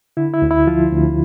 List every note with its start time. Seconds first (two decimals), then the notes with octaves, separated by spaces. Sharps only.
0.17 D3 E4
0.34 E4
0.42 D2
0.51 E4
0.67 F3 F4
0.93 D2